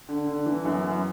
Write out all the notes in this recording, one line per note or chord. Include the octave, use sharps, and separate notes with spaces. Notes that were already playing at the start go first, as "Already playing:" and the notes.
D3
D3
E3
F#2
F#2